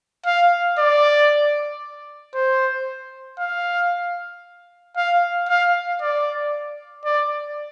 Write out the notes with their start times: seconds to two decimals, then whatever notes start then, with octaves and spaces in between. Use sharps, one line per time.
0.26 F5
0.79 D5
2.34 C5
3.39 F5
4.97 F5
5.49 F5
6.01 D5
7.05 D5